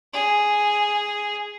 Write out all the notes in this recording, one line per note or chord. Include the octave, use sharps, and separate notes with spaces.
G#4